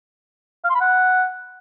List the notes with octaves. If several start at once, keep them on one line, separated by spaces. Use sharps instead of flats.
F5
C6
B5
F#5